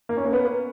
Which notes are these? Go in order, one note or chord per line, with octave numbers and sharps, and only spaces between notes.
A#3
C#4
A#3
B3